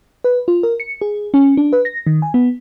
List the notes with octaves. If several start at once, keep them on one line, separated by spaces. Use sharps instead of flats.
B4
F4
A#4
C#7
G#4
C#4
D4
B4
A#6
D#3
G#5
B3